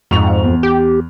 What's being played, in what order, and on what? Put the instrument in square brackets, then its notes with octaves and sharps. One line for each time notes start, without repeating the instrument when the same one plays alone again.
[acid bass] F2 [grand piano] G#2 C#6 F7
[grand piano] E2
[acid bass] G4